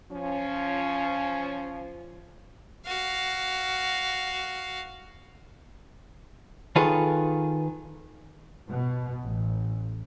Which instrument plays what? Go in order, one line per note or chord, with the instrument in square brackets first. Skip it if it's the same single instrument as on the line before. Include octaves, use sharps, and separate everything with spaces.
[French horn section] F3 C#4
[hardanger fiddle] F#4 F5
[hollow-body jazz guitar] D#3 F4 G#4 A4 B4
[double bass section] B2
A1